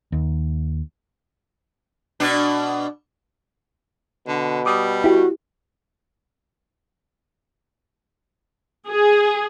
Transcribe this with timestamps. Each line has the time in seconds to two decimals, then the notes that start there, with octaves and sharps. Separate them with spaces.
0.12 D#2
2.20 B2 D4
4.28 B2 D3
4.66 G3 D6 D#6
5.04 E4 F#4 G4
8.87 G#4